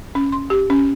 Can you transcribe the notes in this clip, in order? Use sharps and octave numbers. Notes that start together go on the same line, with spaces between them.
C#4
C6
G4
C#4